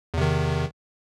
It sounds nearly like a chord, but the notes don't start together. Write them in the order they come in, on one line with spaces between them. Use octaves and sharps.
E2 C3 D#3